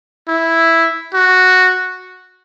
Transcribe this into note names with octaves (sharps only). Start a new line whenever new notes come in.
E4
F#4